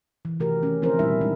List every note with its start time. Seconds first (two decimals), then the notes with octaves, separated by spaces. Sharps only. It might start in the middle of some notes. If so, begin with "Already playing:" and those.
0.25 E3
0.40 C3 D#3 A3 F#4 G4 A#4
0.63 E3 A3 C#4
0.82 D3 F3 C4 E4 A#4 C5
0.99 A#2 D#3 G3 D4 E4 E5
1.21 G#3 D4 D#4